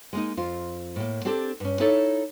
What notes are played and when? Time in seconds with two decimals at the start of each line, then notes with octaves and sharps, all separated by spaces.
0.13 G#3 A#3 D#4
0.37 F2 F4
0.96 A2 A#3
1.25 C4 D4 G4 A4
1.60 G2 C#4
1.80 D#4 E4 A4 C#5 D5